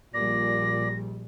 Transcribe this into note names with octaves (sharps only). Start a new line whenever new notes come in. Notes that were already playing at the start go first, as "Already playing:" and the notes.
A#1 A#2 G3 D5 A#6